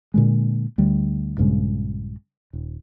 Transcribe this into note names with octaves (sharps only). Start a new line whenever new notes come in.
A#2 D3 G#3
D2 G3
A#1 G2 C#3 G#3
D#1